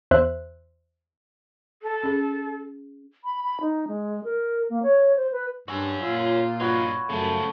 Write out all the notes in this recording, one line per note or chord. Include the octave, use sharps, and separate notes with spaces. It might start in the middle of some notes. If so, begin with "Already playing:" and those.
E2 C5 E5 F#6
A4
C#4 G#4
B5
B5
D#4
G#3
A#4
A#3
C#5
C5
B4
G2 C#4 F#4 E6
A#2 F4 E6
G2 D#4 F#4 B4 C#5
F#2 C#3 F3 A3